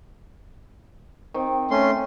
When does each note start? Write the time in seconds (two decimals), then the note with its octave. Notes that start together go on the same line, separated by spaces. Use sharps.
1.34 D#3 C4
1.71 A3 C#4 C6